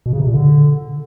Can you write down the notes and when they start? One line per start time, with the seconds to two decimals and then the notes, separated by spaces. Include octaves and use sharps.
0.06 B2
0.13 C#3
0.20 C3
0.27 A#2
0.34 D3